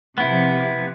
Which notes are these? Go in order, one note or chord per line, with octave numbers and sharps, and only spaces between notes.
C3 F3 B3 E4